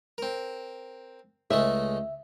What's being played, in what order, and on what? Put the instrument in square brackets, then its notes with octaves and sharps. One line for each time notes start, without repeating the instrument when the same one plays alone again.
[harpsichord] C4 A#4
[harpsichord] C#2 G#3 A3 [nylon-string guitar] E5